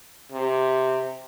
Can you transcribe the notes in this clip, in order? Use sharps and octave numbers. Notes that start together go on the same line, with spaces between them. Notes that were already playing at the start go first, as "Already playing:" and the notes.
C3